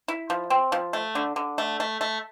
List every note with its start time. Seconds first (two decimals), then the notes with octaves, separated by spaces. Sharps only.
0.08 E4
0.30 F3
0.50 C4
0.72 F3
0.93 A3
1.15 D3
1.36 D3
1.58 A3
1.80 A3
2.01 A3